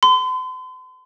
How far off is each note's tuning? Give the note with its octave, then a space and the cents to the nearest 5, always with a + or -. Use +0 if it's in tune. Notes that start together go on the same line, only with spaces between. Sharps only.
C6 -45